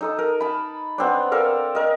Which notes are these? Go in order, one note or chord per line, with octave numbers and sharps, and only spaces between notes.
D#4 A4 D#6
A#4
A5 B5
B3 C4 D4
A4 A#4 D5 F5
A#4 D#5